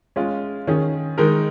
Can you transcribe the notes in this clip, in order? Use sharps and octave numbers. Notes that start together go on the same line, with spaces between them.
G#3 C#4 F4 G#4
D#3 C#4 G#4
D#3 G#3 D#4 A#4